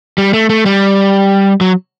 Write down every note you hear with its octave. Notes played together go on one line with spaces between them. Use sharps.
G3
A3
A3
G3
F#3